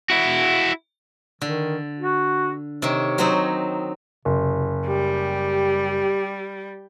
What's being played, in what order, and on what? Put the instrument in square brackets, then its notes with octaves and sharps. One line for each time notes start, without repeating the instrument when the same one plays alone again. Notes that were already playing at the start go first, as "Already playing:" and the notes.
[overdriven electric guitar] E4 F#4
[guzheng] D3 [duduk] D#3
[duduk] F#4
[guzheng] C3 D#3 [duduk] C#5
[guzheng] F#3 C4 D#4
[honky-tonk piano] F#1 [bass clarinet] C3
[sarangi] G3 [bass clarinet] G4